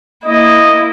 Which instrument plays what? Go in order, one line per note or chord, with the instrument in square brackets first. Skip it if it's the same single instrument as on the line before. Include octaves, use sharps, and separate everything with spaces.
[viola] A#3 E4 [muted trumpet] D#5